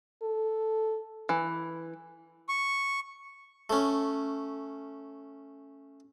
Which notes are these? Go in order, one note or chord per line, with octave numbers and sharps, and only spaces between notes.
A4
E3
C#6
A3 C#4